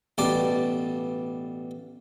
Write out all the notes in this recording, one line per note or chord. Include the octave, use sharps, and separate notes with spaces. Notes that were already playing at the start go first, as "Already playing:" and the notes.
A1 B2 G3 D5 A5 D6